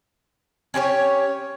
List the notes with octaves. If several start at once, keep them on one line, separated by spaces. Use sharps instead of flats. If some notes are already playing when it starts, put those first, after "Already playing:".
C#4 G4 C5 C#5